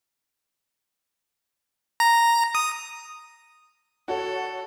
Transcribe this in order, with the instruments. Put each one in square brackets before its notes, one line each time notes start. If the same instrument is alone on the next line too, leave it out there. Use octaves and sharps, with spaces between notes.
[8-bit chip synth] A#5
D#6
[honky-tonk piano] F#4 C#5 [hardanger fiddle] A4